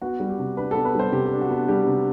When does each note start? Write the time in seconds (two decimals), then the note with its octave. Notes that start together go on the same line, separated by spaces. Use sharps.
0.01 B3 F#4
0.20 G3
0.29 G4
0.39 C3
0.57 D4 B4
0.71 B3 A4
0.85 B4
0.95 G3 C5
1.12 C3 G4
1.26 G4
1.32 D4
1.41 F#4
1.50 B3
1.68 G3 G4
1.87 C3